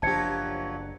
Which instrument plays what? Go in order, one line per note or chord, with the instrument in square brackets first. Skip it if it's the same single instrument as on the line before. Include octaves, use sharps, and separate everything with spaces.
[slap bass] F#1 D4 [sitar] F3 F#3 G4 [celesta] A5 G#6 C#7